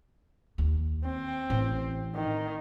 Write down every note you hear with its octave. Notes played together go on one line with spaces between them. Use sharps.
D#2
C4
A1
D#3